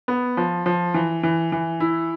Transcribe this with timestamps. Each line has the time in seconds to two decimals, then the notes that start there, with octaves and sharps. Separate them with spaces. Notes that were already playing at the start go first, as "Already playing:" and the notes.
0.08 B3
0.37 F3
0.66 F3
0.94 E3
1.23 E3
1.52 E3
1.80 E4